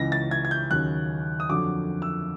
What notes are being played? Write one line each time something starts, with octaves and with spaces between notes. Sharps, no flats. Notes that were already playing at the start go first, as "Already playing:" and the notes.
Already playing: C#2 C#3 E3 A#6
A6
G#6
G#6
G6
D#2 C#3 F#3 F#6
D#6
F2 D3 F#3 D6
E6